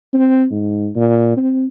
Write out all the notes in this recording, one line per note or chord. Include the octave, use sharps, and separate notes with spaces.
C4
G#2
A#2
C4